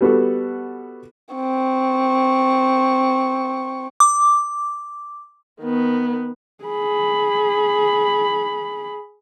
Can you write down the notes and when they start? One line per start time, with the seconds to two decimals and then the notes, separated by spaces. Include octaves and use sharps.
0.01 G3 B3 F#4 A4
1.34 C4 C#6
4.00 D6
5.60 D#3 B3
6.64 G#4 B5